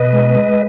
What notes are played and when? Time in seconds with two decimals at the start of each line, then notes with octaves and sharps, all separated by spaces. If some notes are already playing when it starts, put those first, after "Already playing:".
Already playing: B2 B4 D#5
0.13 G#3
0.35 G#3